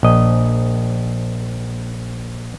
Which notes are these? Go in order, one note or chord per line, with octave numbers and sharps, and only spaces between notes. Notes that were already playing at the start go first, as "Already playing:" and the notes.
A#1 D#5